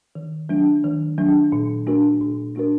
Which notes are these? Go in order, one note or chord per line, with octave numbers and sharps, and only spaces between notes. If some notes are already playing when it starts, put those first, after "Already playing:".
D#3
F#3 A3 D4
D#3
F#3 A3 D4
A#2
A3 D4 F#4 A#4
A#2
A3 D4 F#4 A#4